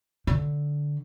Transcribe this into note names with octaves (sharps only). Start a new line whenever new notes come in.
D3